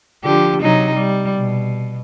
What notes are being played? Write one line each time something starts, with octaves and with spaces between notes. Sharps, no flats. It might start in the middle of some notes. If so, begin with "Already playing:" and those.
D3 F3 G4
C3 F#3 D#4
G3
B2